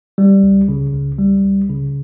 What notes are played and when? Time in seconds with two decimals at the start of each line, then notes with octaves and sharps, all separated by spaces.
0.18 G3
0.43 C#2
0.69 C#3
0.94 C#2
1.18 G3
1.44 C#2
1.69 C#3